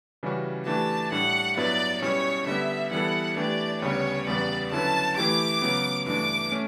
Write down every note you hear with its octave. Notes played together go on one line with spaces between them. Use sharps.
C#3 E3 G3 C#4 F#4
E3 A3 D4 G4 A5
A2 G3 D4 F#5
G2 F#3 B3 E4 B4 D5
B2 G3 C#4 E4 C#5
D3 G3 B3 E5
E3 G3 B3 E4 A4 F#5
E3 A3 D4 G4 D5
D2 C#3 G3 B3 C#5
E2 C#3 G3 B3 D5
D3 F#3 C#4 E4 B4 A5
E3 A3 E4 G4 D6
C#3 F#3 B3
G2 E3 A3 D4 D6
A3 C#4